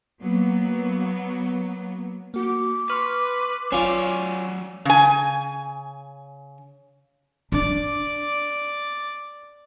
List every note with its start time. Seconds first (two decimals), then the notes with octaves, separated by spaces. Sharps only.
0.21 F#3 A#3 B3
2.34 A#3 F#4 D6
2.90 B4 C6 C#6 F6
3.72 F#3 C#4 F4 D5
4.85 C#3 G#5
7.52 D4 D5